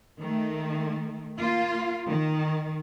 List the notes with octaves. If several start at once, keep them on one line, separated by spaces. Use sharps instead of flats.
D#3 A3
A#3 F4
D#3